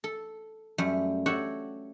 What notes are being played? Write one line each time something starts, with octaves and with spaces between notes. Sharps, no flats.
A4
F#2 G3 A3
F#4 G4 A4 C#5 E5 F#5